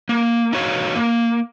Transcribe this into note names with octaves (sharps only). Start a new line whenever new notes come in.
A#3
D#4 F#4 C#5 F5
A#3